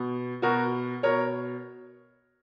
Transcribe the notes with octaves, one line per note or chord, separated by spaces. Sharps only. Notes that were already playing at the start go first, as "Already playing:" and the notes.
Already playing: B2
B2 F#4 A#4
B2 A#4 C#5